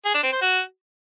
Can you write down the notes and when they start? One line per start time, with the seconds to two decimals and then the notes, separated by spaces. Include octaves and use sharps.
0.05 G#4
0.14 D4
0.23 C4
0.32 C5
0.42 F#4